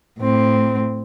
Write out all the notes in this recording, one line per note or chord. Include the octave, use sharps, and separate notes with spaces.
A2 C4